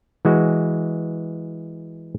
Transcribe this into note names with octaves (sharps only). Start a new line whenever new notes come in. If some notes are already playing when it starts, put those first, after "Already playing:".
E3 G#3 F#4